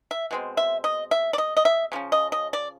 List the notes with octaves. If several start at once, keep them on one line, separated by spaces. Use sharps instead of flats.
E5
B2 G#3 C4
E5
D#5
E5
D5
D#5
D#5
E5
C#3 F3 C#4
D#5
D#5
D5